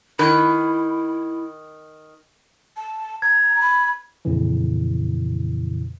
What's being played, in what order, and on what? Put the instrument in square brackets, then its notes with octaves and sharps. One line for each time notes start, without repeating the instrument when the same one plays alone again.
[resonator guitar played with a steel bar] D#3 [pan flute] E4 [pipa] B4
[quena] A5
[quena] A#5 [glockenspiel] G#6
[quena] B5
[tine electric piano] F2 A#2 C#3 E3